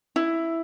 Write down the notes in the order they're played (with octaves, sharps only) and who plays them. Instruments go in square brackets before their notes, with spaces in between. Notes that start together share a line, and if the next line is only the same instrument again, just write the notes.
[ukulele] E4